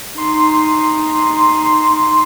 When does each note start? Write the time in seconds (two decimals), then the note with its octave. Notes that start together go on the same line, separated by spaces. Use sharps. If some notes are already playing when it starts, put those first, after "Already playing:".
0.18 D#4 C6